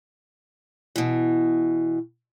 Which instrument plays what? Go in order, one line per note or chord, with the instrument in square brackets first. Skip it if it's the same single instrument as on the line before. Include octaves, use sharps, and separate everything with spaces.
[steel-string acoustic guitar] B2 E3